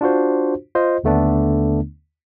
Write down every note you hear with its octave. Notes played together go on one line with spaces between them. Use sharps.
D4 F4 F#4 C5
F4 C5 D#5
D#2 D3 A3 B3 D4